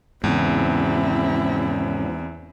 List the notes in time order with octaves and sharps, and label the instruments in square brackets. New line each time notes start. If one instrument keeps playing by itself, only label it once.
[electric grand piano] E2 [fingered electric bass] G#2 C#3 [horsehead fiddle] C4 E4